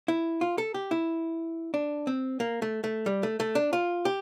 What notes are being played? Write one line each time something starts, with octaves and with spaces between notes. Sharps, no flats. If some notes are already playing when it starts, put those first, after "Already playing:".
E4
F4
A4
G4
E4
D4
C4
A#3
A3
A3
G3
A3
A3
D4
F4
G4